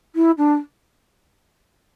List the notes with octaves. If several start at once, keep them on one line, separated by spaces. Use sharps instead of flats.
E4
D4